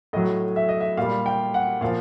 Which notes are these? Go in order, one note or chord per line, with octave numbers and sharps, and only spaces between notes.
A2 F#3 D#5
E5
D#5
E5
A#2 G3 F5
G5
F#5
A#2 F3 F5